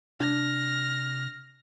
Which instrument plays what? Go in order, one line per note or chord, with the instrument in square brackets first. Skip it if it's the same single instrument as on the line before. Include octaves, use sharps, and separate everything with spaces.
[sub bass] C3 [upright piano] D4 [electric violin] F6 A#6